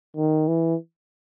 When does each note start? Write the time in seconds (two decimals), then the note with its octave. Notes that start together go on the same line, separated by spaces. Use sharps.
0.16 D#3
0.48 E3